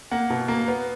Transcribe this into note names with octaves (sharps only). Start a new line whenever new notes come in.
A#3 F#5
B2
A#3
B3